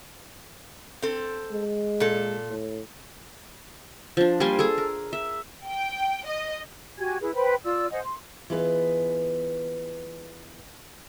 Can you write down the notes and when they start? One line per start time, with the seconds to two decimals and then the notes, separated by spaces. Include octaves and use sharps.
1.02 C4 A4
1.51 G#3
2.00 A#2 A4
2.50 A2
4.17 F3 D4
4.40 G3 A#3 G#5 C6
4.59 G#4 A4
4.78 A#4
5.13 E5
5.66 G5
6.26 D#5
6.98 F#4 G4 G#5 G#6
7.20 E4 G#4 B4
7.34 B4 C5 G5 B5
7.64 F4 D5 E6
7.91 C5 D#5 F#5 G#5
8.02 C6
8.50 E3 B3 F4 G#4 B4 D#5